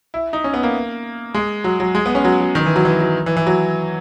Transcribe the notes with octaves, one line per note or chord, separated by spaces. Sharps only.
E4
D#4
C#4
B3
A#3
G#3
F#3
F#3
G#3
B3
C#4
F#3
F#3
D#3
E3
F#3
E3
F#3
E3
E3
F#3